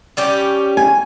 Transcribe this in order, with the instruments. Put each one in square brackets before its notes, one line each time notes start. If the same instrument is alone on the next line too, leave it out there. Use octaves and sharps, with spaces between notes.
[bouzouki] G3 C#4 G4
[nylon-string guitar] G#5